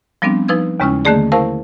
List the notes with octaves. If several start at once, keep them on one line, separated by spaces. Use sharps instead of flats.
F3 G3 B3 C4 D4
F3 D#4 B4 E6 G#6
D#2 C#3 G#3 C#4 E4 F6
D3 D#3 A3 A#3 G#4 D5
E4 A#4 C5 F5 A5 C#6